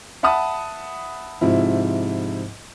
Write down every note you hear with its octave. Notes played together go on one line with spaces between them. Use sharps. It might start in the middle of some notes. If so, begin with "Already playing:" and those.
E5 F#5 A5 B5 D#6
G#2 C3 F3 E4